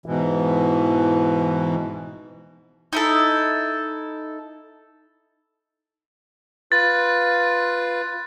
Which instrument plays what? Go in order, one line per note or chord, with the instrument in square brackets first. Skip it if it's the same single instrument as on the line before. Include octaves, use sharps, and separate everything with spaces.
[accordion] G#2 B2 E3
[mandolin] D#4 E4 A4
[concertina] F4 B4 [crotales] A6